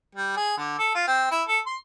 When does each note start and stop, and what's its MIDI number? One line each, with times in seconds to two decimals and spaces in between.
0.15 0.32 55
0.37 0.54 68
0.58 0.78 50
0.79 0.92 69
0.95 1.05 65
1.07 1.29 60
1.31 1.43 64
1.48 1.59 69
1.66 1.77 84